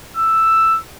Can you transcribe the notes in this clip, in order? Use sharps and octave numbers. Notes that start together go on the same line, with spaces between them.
E6